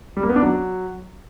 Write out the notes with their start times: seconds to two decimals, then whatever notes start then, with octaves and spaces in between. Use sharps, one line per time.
0.17 G3
0.23 A#3
0.29 B3
0.36 D4
0.42 F#3